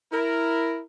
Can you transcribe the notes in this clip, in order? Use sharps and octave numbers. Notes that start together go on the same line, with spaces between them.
E4 A#4